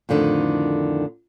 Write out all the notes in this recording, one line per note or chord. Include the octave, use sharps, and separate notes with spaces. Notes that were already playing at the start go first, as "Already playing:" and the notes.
F2 A2 D3 D#3